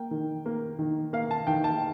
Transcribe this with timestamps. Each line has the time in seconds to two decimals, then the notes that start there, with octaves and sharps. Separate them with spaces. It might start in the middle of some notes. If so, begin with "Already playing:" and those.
Already playing: A#3 G5
0.11 D#3
0.46 A#3
0.79 D#3
1.13 A#3 F5
1.31 A5
1.47 D#3 G5
1.64 A5